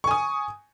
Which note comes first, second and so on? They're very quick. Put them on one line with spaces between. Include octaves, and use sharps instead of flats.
C#6 G#5 D#6